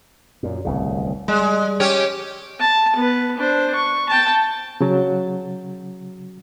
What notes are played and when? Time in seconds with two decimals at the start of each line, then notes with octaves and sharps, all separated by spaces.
0.43 F#2 A#2
0.65 D1 C2 C#3
1.28 G3 G#3
1.80 C#4 G4 C#5
2.60 A5
2.95 B3 B4
3.37 D4 C5
3.74 C#6
4.09 G5 A5
4.81 C#3 F#3